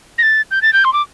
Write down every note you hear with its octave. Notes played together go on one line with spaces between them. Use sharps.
A#6
A6
G6
A6
G6
C6
D6